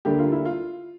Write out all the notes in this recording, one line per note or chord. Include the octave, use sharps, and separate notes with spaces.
D2 D3 G3 A#3 D4 G4
F4
E4
F4